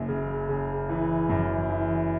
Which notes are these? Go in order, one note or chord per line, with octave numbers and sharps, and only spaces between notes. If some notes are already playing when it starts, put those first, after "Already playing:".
Already playing: F#1 F#2
C#3
C#3
E3
F#2
E3